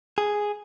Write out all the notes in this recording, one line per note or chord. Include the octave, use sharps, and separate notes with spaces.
G#4